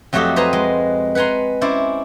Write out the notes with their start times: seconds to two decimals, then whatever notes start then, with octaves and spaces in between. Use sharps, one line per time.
0.13 F2 F#3 A3 F#4 G4 D#5
0.36 B4 C5 D#5 G#5 A#5
0.53 G#3
1.15 B4 F#5 G#5 A#5 C6
1.61 C#4 E4 C5 D5